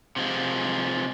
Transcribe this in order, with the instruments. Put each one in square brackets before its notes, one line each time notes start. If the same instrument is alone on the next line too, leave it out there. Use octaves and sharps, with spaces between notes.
[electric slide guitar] C3 F3 G#3